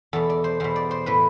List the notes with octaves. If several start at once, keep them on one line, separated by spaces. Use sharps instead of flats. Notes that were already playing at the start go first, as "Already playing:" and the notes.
E2 B2 A4
D5
C5
E2 B2 C5
D5
C5
A2 E3 B4